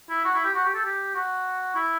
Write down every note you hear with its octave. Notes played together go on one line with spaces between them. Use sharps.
E4
F#4
E4
G4
F#4
G4
A4
G4
F#4
E4